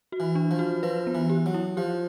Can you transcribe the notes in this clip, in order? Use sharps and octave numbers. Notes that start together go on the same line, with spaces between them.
F#4
E3
D4
F3
F#4
F3 B4
B3
E3
G4
F#3
E4
F3 G4